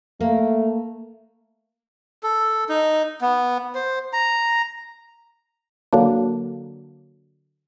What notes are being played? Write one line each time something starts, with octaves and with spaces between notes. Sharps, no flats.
A3 A#3
A4
D#4
B3
C5
A#5
D3 F#3 A#3 D4